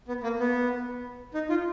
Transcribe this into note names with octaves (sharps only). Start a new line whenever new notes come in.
B3
A#3
B3
D#4
F4